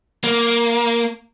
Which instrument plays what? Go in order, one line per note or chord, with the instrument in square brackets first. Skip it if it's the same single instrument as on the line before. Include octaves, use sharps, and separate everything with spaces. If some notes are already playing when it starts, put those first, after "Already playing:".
[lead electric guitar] A#3